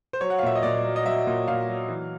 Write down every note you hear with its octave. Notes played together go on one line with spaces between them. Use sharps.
C5
F#3 C#5
F#5
F5
A#2 E5
D#5
A#2 D5
F#3
D#5
F#3 E5
A#2
A#2 F5
F#3
E3